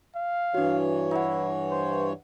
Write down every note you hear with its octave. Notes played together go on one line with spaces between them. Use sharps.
F5
G2 E3 D4 F#4 C#5
E4 E5 F#5
C5